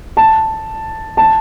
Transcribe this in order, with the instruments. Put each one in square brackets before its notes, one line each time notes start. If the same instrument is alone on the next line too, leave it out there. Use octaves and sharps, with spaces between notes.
[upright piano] A5
A5